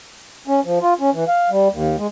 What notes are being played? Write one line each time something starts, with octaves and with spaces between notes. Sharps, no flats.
C#4
F3
F4
C#4
E3
F5
G3
D#2
G#3